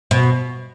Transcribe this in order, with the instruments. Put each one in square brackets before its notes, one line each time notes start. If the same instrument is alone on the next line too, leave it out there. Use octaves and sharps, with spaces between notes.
[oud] B2